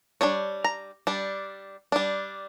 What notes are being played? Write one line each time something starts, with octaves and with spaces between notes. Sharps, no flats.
G3 D4 C#5
A#5
G3 D4
G3 D4